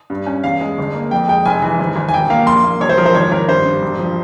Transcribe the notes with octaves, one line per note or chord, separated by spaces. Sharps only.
G2
C#4
E2 F5
G#3
G1
A#3
F2 G5
G#3 G5
F1 G#5
E3
G#1
G#1
G#5
E1 G5
A#3 F5
A#1 C6
A#3
E1 C#5
C5
F3 A#4
C5
G#1 C#5
G#1 A#4
G2 C5
G2
E1
F3